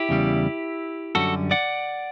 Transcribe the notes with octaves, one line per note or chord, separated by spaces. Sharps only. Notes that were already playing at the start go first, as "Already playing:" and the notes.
Already playing: E4 G4
E2 C#3 G3
F#2 D3 G3 C#4 F#4 A4
D5 F#5